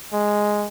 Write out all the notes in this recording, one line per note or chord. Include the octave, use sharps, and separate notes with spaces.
G#3